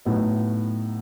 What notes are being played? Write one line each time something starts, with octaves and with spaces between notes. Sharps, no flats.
A2 F#3 B3 D#4